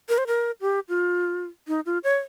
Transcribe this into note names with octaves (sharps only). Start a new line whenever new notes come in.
A#4
C5
A#4
G4
F4
D#4
F4
C#5